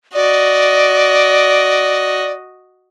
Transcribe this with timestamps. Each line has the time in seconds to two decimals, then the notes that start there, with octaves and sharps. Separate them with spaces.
0.14 F#4 D5 D#5